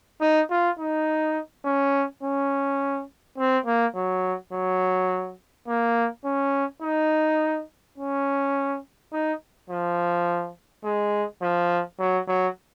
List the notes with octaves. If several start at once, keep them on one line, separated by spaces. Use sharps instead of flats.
D#4
F4
D#4
C#4
C#4
C4
A#3
F#3
F#3
A#3
C#4
D#4
C#4
D#4
F3
G#3
F3
F#3
F#3